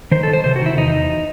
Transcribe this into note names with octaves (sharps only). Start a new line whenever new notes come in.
D#3 C5
A4
D#3
C5
C3 C5
F#4
D#3 E4
E2 D#4
E2